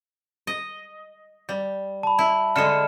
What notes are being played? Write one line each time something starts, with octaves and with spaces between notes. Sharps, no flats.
D#5
G3
A5 B5
E4
D3 G#3 F6 C#7 E7